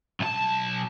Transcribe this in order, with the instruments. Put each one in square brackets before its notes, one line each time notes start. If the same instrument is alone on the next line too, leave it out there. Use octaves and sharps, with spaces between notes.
[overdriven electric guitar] B1 A5